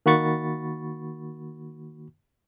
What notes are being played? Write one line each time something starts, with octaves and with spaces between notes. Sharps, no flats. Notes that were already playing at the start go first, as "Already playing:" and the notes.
D#3 A#3 F#4 B5 C#6 A6